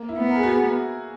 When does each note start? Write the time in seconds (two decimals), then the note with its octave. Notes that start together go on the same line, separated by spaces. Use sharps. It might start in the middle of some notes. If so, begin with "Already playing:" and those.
Already playing: A#3
0.09 E4
0.19 B3
0.29 A#4
0.36 G#4
0.43 F#4
0.51 G#4